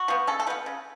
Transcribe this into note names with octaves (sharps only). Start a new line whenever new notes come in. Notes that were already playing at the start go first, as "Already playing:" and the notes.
Already playing: F#4
F3 B3
C#3 A4
A4
F3 B3 B4
C#3